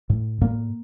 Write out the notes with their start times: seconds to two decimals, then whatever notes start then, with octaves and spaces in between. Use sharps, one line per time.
0.10 A2
0.41 A2 A#3